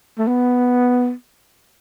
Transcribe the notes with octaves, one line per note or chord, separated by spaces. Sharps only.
A3
B3